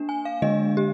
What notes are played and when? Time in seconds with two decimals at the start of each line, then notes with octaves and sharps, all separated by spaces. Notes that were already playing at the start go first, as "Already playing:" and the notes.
Already playing: A#3 D4
0.09 G#5
0.25 F5
0.42 D3 G#3 D4 D#5
0.77 G4